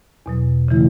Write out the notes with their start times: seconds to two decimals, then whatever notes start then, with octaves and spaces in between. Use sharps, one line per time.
0.26 E2 B2 F#3
0.68 C#3 E3 A3 E4